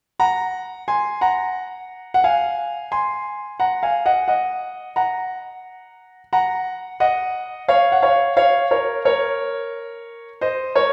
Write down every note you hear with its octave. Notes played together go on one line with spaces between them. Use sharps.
F#5 A#5
G#5 C6
F#5 A#5
F#5
F5 G#5
G#5 C6
F#5 A#5
F5 G#5
D#5 F#5
D#5 F#5
F#5 A#5
F#5 A#5
D#5 F#5
C#5 F5
F#5
C#5 F5
C#5 F5
A#4 C#5
A#4 C#5
C5 D#5
A#4 C#5